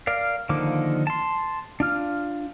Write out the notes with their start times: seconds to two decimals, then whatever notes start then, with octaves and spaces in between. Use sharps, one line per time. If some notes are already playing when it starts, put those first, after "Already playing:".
0.07 A#4 D5 F5
0.49 D3 D#3 F3 A#3 D6
1.07 A5 C6
1.80 D4 F4 F6